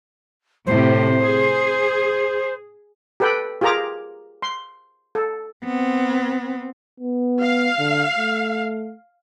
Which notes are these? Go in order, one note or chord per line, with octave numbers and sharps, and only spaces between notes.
A2 C3 C5
G#4
G4 A4 B4 G5 B5
F4 G4 G#4 A#4 A#5 D6
C6
A4
B3 C4
B3
F5
D3
A3